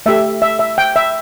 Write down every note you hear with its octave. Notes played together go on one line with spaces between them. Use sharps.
A3 G4 E5
E5
E5
G5
E5